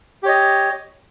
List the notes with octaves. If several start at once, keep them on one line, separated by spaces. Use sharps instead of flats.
G4 C#5 D#5